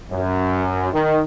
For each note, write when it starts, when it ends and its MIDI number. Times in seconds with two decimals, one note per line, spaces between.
0.11 0.92 42
0.93 1.21 51